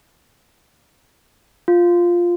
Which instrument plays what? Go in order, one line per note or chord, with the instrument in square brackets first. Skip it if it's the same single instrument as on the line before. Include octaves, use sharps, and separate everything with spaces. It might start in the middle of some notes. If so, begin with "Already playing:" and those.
[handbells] F4